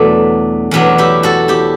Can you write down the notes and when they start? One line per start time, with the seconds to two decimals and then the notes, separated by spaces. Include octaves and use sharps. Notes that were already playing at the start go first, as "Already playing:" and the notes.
Already playing: E2 B2 F#3 A3 B3 D4
0.71 E2 B2 F#3 B3 D4
0.98 E4 G4
1.23 F#4 A4
1.48 E4 G4